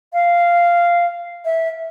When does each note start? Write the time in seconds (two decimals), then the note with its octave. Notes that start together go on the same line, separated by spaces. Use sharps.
0.13 F5
1.45 E5